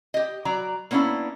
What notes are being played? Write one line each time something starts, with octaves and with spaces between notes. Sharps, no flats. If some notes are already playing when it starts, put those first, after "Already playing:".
G4 D#5
F#3 D5 A#5
A#3 B3 C#4 D4 E4